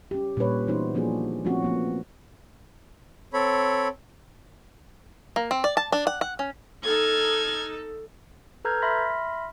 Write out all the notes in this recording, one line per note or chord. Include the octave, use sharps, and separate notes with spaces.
C#4 G4
A#2 G3 C#4 D4 B4 C#5
E3 B3 C#4 D#4 F#4 C5
F3 A#3 D4 F#4 G#4
F3 A3 C4 C#4 F#4
F3 A#3 B3
C4 A4 C#5 B5
A#3
C4
D5
A5
D4
F#5
F#5
C#4
D#4 A4 F6 G#6
A4 B4 A#5 F6 G6 G#6
E5 B5 C6 F6 A#6 B6